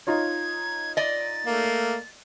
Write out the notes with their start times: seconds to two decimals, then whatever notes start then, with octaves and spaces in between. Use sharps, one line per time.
0.07 D#4 F4 C#5 G#6
0.97 D5 D#5 A6
1.46 A3 A#3